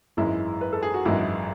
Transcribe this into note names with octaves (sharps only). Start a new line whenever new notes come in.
G#1 F#2 E3 G#3 E4
B4
A4
G#4
F#4
G#1 F#2 E3 G#3 E4